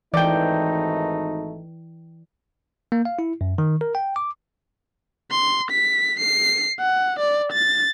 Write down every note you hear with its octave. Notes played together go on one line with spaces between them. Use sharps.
G#1 E3 A3 D#4 D5 G5
A#3
F5
E4
F#2
D#3
A#4
G5
D6
C6
B6
C7
F#5
D5
A6